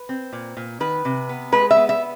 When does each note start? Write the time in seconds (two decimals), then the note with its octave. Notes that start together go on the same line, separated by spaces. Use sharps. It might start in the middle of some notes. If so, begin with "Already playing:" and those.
Already playing: B4
0.09 C4
0.33 A#2
0.57 A#2
0.80 D#3 B4
1.05 C3
1.29 B3
1.52 G#3 B4
1.71 E5
1.76 B3
1.89 E5